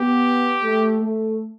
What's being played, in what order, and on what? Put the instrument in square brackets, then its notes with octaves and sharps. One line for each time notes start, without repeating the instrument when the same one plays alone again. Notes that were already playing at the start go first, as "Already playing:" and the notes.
Already playing: [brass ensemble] B3 [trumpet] G4
[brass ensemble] A3
A3